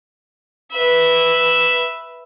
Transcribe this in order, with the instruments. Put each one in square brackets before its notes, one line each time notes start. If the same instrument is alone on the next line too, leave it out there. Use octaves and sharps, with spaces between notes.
[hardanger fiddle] B4 E5